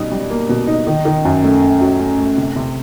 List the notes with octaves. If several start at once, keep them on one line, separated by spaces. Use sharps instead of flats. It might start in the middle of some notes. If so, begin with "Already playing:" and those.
Already playing: B2 G3 D#4
G3
A#3
B2
D#4
D#3
D#3
F#2
A3
A3
F#3
A3
A3
C3
C3